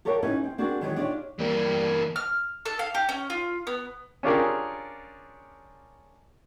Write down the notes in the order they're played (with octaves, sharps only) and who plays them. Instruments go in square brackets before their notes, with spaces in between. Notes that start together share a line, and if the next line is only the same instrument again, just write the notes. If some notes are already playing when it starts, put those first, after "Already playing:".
[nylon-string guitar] G4 A4 A#4 C#5 F5 G5
C#4 D#4 E4 G4 B4
C4
C4 D4 F#4 G#4 A#4
D#3 E3 F#3 G#3 G4 C#5
D4 D#4 F4 G4 C#5
[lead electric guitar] E3 A#3 [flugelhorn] G3
[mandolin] F6
A4
F5
G4
C#4
F4
B3
[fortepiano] C#4 D4 F4 G4 G#4 A#4